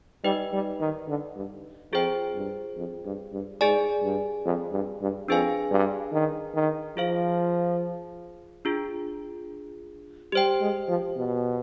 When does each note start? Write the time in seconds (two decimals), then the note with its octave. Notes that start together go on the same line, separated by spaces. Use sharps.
0.24 G3 D#4 B4 D#5 G5
0.53 G3
0.81 D#3
1.08 D3
1.36 G2
1.92 F2 F4 G#4 C5 G5
2.35 G2
2.77 F2
3.05 G2
3.33 G2
3.61 G#2 G#4 D5 G#5
4.03 G2
4.45 F2
4.72 G2
5.01 G2
5.28 F2 D4 G#4 B4 F5 G#5
5.71 G2
6.13 D#3
6.55 D#3
6.97 F3 F4 G#4 C5 F5
8.65 D4 F4 G#4
10.32 G3 G4 C5 G5
10.61 G#3
10.88 F3
11.17 B2